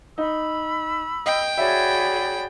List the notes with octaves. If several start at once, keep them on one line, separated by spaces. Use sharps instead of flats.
D#4 B5 E6
D#5 G5
F#4 G#4 C#5 D5 E5 B5